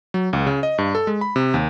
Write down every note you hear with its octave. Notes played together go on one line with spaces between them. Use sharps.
F#3
C#2
C#3
D#5
G2
A4
G#3
B5
C3
D#2